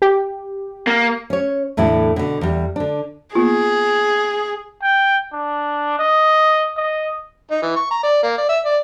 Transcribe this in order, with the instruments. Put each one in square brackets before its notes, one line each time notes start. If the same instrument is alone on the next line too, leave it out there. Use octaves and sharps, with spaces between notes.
[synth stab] G4
[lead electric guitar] A#3
[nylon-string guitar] C#4 C#5
E2 A2 D3 E4 A4
B2 D3
E2 G3
D3 D4
[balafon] A#3 B3 F4 [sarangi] G#4
[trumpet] G5
D4
D#5
D#5
[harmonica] D#4
E3
C#6
A#5
D5
A#3
D5
E5
D5